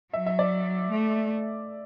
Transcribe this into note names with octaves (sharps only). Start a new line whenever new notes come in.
F#3 E5
E5
D5
A3